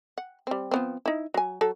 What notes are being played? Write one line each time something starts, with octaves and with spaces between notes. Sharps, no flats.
F#5
G3 C4
F3 B3 C4
D#4 E4
F#3 G#5
F#3 A4